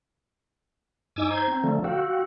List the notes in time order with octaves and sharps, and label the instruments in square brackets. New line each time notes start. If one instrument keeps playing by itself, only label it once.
[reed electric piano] G2 D#4 D#5 [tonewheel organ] G#5 D6 E6
[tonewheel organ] C5 G#6 [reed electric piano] A#5
[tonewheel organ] C4
D3 F3 A3
[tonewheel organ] F#4 [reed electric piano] F5 G5 E6